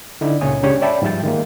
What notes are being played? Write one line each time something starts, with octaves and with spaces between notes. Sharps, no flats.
D3 D#4 E4 D5
C#2 A#2 C#3 C#5 G#5 D#6
C#3 G#3 D4 G4 C#5
C#5 D5 E5 G5 A5 B5
G#2 F3 G3 E5 G5 A6
D#3 G#3 A#3